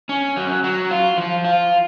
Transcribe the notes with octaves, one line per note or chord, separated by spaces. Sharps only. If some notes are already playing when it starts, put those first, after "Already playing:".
C#4
F#3
F#3
F4
F3
F4